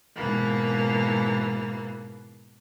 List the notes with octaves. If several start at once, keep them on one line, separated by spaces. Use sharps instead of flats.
G#2 B2 E3 A#3